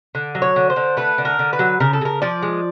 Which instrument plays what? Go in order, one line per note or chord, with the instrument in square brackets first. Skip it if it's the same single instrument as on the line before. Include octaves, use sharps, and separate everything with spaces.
[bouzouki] D3
F#3
C#5
D3
C5
D3
A3 B4
D3
A#4
D3
B4
F#3
C#3 A#4
A4
C#3 A#4
F3 D5
G#3